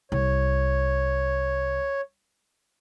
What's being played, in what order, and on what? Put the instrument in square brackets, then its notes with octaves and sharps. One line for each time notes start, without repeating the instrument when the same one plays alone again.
[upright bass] C2 [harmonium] C#5